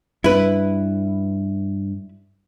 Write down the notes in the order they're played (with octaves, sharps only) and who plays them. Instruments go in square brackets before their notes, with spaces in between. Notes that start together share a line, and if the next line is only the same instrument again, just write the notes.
[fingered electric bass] G2 [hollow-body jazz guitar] E4 B4